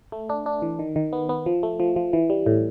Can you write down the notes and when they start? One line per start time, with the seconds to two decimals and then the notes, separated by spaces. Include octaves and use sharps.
0.12 A3
0.30 D4
0.46 D4
0.62 E3
0.79 D#3
0.96 D#3
1.13 B3
1.29 B3
1.46 F3
1.63 A3
1.80 F3
1.96 F3
2.13 E3
2.30 G3
2.46 A2